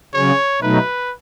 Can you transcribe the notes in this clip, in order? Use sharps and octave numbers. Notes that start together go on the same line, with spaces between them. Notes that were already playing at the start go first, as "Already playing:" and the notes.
C#3 F#3 C#4 C#5
B2 F#3 A3 D#4 B4